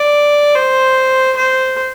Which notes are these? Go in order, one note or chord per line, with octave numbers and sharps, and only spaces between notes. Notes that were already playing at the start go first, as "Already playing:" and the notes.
Already playing: D5
C5
C5